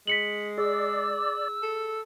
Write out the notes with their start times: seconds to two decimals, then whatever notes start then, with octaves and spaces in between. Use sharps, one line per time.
0.07 G#3 B6 C#7 F#7
0.58 G#4 D5 E6
1.63 A4